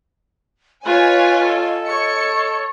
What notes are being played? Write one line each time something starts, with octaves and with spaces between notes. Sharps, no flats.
F4 B4 C#5 D#5 G#5
A4
C#5 C#7